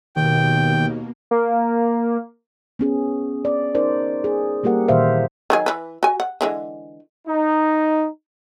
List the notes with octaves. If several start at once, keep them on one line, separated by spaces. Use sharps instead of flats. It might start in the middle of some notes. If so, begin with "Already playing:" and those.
D#2 B2 D#3 A#3 G5
A#3
B3 C#4 G#4
D5
C#4 D#4 A#4 C5 D5
G#4
G3 A#3 G4 A#4 F#5
A#2 D#3 E3 C5 E5 F5
D#3 F#3 G#4
E3 B4
F#4 G#5
F#5
D3 E3 G#3
D#4